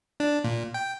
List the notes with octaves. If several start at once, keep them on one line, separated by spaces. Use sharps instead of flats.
D4
A#2
G5